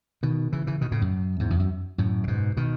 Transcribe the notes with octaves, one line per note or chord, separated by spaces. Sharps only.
B2 D#3
C#3 E3
C#3 E3
B2 D#3
A2 C#3
F#2
E2 G#2
E2
F#2
F#2 A2
C#3
G#2 B2
B2 D#3